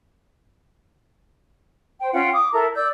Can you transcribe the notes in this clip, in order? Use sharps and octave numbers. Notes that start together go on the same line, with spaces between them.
C5 G5
C#4 F4 F#5 G5
D6 D#6
E4 A4 A#4 A#5
D5 E6 G6